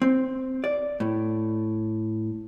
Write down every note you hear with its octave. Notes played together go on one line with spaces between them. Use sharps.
C4
D5
A2